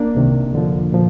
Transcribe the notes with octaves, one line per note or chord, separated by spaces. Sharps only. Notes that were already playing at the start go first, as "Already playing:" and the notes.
Already playing: A#3 D4
C2 C3 D#3
F2 D3 F3
A#2 F3